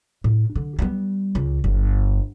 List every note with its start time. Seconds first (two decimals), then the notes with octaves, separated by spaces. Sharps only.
0.24 A2
0.56 D3
0.79 G3 B3
1.35 C#2
1.64 G1